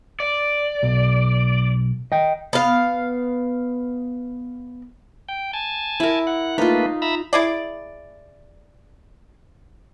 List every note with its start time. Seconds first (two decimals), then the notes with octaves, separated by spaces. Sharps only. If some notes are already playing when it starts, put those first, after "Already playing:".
0.20 D5
0.83 B1
2.12 D#5 G5
2.53 B3 F5
5.29 G5
5.53 G#5 A5
6.00 E4 A#4
6.27 F#5
6.58 A3 A#3 D#4 F4 B4
7.02 E5 A#5 B5
7.33 E4 G#4 D5